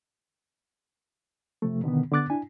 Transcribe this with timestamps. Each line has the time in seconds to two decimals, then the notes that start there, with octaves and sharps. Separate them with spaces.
1.62 C3 F3 A3
1.84 B2 D3 D#3 B3
2.12 D3 B3 D6 F#6 A6
2.30 D4 E4 G#5